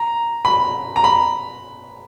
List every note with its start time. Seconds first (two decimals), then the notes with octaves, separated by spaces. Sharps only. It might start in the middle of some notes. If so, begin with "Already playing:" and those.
Already playing: A#5
0.45 B5
0.96 A#5
1.04 B5